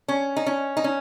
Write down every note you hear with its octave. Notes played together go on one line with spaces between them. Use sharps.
C#4
D#4
C#4
D#4
C#4